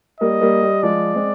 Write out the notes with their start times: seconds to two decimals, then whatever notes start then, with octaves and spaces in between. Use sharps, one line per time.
0.21 G3 A#3 D#5
0.41 G3 A#3
0.62 G3
0.83 F3 G#3 D5
1.15 G#3 C4